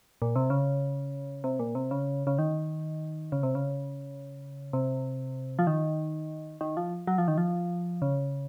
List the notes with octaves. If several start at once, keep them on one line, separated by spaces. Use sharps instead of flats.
A#2
C3
C#3
C3
A#2
C3
C#3
C#3
D#3
C#3
C3
C#3
C3
F3
D#3
D#3
F3
F#3
F3
D#3
F3
C#3